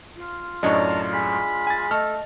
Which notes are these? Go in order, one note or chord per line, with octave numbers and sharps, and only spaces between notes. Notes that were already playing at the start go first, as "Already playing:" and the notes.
F4
F#2 A2 D4 C#5 D#5 A5 A#5
G#3 B5
G#5 A6
A3 A4 D#5 F6